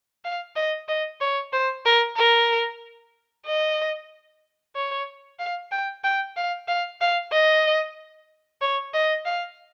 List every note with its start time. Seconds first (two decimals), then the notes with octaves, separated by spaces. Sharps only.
0.24 F5
0.56 D#5
0.88 D#5
1.21 C#5
1.53 C5
1.86 A#4
2.17 A#4
3.46 D#5
4.76 C#5
5.39 F5
5.72 G5
6.04 G5
6.37 F5
6.68 F5
7.01 F5
7.32 D#5
8.61 C#5
8.94 D#5
9.25 F5